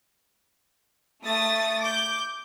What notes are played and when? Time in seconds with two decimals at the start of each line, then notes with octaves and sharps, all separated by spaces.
1.22 A3 D#6 A6
1.81 D6 G6